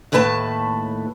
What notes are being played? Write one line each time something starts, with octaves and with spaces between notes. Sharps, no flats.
D#2 A2 A3 B4 G#5 A5